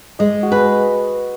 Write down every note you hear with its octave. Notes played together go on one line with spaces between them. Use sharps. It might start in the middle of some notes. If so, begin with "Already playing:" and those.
G#3 D#5
F#4
G#4 B4